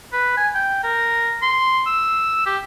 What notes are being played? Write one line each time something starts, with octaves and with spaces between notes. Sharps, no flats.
B4
G#5
G5
A#4
C6
E6
G4